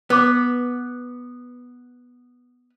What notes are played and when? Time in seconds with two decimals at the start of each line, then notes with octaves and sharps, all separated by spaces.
0.10 B3 B4 D6